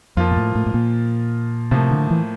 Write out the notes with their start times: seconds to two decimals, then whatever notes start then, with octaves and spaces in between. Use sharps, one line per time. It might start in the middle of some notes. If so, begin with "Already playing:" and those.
0.17 F2 F3 A#3 F4
0.31 A#2
0.37 A2
0.55 A2
0.66 A2
0.74 A#2
1.71 A2 C3 F3 A#3
1.91 D3
2.11 E3